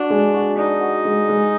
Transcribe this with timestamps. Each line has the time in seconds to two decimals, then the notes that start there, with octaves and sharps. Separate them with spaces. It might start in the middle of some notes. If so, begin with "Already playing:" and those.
Already playing: D4 F#4
0.10 G#3
0.34 F#4
0.57 D4 D#4
0.81 F#4
1.05 G#3
1.29 G#3